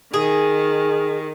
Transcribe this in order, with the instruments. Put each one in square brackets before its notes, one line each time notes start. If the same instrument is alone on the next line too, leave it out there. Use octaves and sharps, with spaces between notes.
[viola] D#3 [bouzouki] G#4